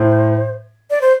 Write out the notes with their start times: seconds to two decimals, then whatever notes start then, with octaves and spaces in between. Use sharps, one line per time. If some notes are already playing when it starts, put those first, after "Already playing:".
Already playing: A2 C5
0.90 D5
1.01 C5